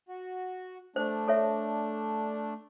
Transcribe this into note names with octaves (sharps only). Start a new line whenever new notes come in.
F#4
A3 D4 C5
A4 C#5 E5